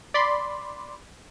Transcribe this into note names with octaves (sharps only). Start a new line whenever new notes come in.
D5 B5 C6